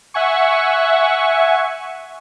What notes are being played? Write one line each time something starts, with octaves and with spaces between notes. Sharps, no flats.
E5 F#5 G#5 C#6